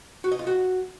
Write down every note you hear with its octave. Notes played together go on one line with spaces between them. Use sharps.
F#4
D#5
F4
F#4